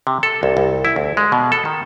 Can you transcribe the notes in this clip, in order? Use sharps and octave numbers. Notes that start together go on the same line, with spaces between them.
C3
A4
C2
C2
E4
D2
G#3
B2
A4
D#3